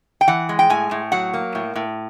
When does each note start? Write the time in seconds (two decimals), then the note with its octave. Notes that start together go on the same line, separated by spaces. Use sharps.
0.21 G5
0.28 E3 F#5
0.49 G#3
0.59 G5
0.70 A2 G#5
0.91 A2
1.12 F#3 F#5
1.34 A#3
1.55 A2
1.75 A2